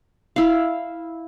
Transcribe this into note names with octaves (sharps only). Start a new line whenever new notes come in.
E4 F5